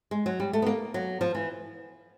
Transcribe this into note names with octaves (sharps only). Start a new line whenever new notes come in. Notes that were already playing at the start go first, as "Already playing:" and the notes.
G#3
F#3
G3
A3
B3
A#3
F#3
F3
E3